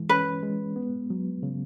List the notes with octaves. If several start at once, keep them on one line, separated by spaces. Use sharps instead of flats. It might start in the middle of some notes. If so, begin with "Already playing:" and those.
Already playing: E3 G#3
C#4 B4
G#3
B3
F#3
C#3